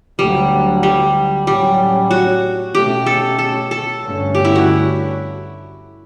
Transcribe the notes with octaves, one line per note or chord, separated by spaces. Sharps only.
D2 D3 F#3 G3
G3
A2 F#3 G3 C#4
F#4
B2 A3 C#4 G4
A4
A4
A4
G2 D3 A3 C#4
G4
E4
F#4